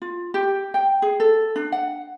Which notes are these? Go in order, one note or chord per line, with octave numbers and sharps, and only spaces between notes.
F4
G4
G5
G#4
A4
D4
F#5